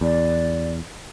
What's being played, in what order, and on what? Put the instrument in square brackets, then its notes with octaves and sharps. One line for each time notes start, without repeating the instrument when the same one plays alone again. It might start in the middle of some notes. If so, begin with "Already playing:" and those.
[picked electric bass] E2 [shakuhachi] D5